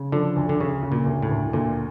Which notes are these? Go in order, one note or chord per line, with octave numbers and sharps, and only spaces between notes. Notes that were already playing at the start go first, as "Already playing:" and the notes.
Already playing: C#3
D3 F3
D2
D3
D2 C#3
C#3
A#2
D2
A2
D2
D2 A#2